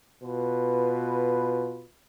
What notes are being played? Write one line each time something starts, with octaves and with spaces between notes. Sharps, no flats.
B2 F4 B4